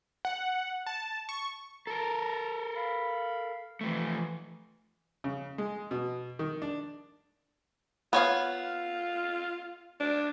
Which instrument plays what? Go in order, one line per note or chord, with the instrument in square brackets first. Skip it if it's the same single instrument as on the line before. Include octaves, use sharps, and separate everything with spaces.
[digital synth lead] F#5
A5
C#6
[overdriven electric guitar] A4 A#4 [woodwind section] A5 A#5
[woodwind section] F5 B5
[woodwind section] E3 [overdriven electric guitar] F3 A3
[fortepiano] C#3
G#3
B2
D#3
D4
[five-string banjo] B3 C#5 F5 [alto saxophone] F4
[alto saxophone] D4